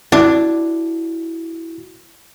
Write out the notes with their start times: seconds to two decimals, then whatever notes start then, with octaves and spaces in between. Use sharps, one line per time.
0.12 D4 E4 F#4